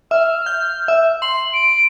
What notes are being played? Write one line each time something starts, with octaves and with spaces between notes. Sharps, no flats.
E5 F6
G6
E5
C6 F#7
D7